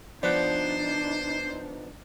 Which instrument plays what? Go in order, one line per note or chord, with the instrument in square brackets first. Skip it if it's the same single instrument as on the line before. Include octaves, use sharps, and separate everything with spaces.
[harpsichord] F3 B3 [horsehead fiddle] D4 D#4 [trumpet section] C5 [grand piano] D5 F#6